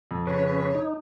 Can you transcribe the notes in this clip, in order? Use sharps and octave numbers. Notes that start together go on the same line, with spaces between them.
F2
C#3 C#4 B4 C#5
D#4